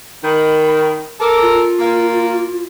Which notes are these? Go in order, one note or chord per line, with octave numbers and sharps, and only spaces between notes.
D#3 B5
A4 A#4 D6
F4
A#3